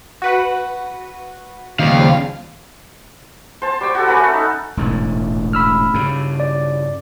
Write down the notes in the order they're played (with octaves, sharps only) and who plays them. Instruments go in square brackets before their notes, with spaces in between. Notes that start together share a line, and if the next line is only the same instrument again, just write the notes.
[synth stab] F#4 B4 F#5
[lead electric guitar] D#2 [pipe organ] C#3 F3 G3 [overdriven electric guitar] F5
[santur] C5 A5
G3 C#5 G5
F#4 G4 A4
C#4 A4 B4 F#5
A3
D#4
[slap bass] E1 A1 G#2
[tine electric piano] B5 E6 F6
[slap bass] G2 C#3
[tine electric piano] D5